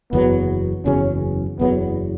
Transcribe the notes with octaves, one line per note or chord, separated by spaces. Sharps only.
F#1 E2 C#3 F#3 B3
F#1 E2 C#3 F#3 C#4
F#1 E2 C#3 F#3 B3